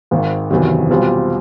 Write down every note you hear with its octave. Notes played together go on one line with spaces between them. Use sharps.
G#1 G#2 D#3
F#1 E2 C3 D#3 F#3
B1 B2 G3 C4 F4